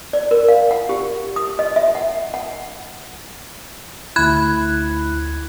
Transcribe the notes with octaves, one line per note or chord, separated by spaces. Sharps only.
D5
A#4
F5
F#5
G4
D#6
D#5
E5
F#5
F#5
D2 E4 B5 F#6 G#6